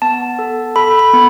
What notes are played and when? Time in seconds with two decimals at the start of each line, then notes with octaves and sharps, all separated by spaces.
0.02 B3 A5
0.39 A4
0.76 A4 B5
0.99 B5
1.13 B3